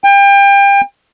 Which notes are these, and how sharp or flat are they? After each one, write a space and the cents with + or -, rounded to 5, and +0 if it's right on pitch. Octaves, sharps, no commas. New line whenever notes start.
G5 +30